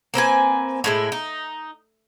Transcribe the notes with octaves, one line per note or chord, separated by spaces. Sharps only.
A#3 C4 B4 G#5
A2 G#3 E4
D#4